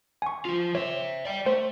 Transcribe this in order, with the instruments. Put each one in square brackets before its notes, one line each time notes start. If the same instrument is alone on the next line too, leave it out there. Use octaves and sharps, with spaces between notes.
[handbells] G#5 C#6
[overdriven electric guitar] F3 F4
[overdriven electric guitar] C5 E5 [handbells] C#5
[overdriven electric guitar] D5 G5
[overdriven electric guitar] A3 [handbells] C5